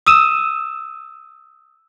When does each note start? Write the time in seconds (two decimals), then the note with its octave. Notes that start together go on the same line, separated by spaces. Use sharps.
0.06 D#6 E6 D#7 E7